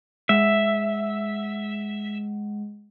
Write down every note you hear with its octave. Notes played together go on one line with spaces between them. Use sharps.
G#3 E5 F#5